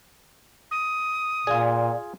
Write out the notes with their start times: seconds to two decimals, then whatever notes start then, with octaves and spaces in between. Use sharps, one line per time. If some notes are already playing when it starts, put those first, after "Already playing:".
0.71 D#6
1.47 A#2 F4 G#4 D5 F5